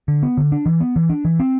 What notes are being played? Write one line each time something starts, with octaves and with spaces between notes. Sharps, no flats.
D3
B3
D3
D4
E3
B3
E3
D4
E3
C4